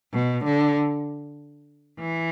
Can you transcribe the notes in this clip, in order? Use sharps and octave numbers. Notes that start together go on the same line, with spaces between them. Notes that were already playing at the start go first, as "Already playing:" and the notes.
B2
D3
E3